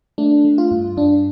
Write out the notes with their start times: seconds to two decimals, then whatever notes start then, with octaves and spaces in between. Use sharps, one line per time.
0.18 A3 D4
0.45 A3
0.58 F4
0.71 G2
0.97 G2 D4